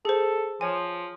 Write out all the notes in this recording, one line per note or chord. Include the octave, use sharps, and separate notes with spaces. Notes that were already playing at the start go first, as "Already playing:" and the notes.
G#4 A4 C5
F3 C#5 G#5